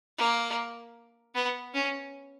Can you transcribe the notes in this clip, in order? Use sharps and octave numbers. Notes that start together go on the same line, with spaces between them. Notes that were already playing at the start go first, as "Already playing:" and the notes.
A#3
B3
C#4